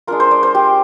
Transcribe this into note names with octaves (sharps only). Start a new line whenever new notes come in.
G#3 D4 F4 A#4
C5
D5
C5
G4